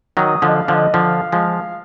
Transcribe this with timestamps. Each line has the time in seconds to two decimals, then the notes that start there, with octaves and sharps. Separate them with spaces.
0.17 D#3 F#3 D#6
0.37 D#6
0.42 D3 F3
0.48 D#5
0.55 F5
0.68 D3 F3
0.74 D#5
0.94 D3 F3 F5
1.32 F3 G#3